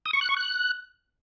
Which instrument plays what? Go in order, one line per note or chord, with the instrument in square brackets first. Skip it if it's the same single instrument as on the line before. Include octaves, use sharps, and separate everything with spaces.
[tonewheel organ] D#6
C#6
F#6
C#6
F#6